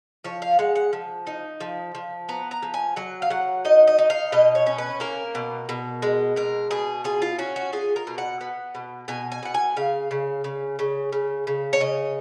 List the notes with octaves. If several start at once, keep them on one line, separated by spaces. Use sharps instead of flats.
F3 C#5
F5
G#3 F#5
F#5
F3
D#4
F3
F3
B3 A#5
A#5
F3
G#5
F#3 F#5
F5
F#3 F#5
D#4 D#5
D#5
D#4
F5
B2 D#5
C#5
C#4
B4
A#3 A#4
B2
B2
G#3
B2 A#4
B2 G#4
F4 G#4
F4
C#4 F#4
F#4
F4 G#4
A#4
B2
F#5
B3
B2
B2 G#5
G#5
B2 F#5
G#5
C#3 F5
C#3
C#3
C#3
C#3
C#3
C#5
C#3 D#5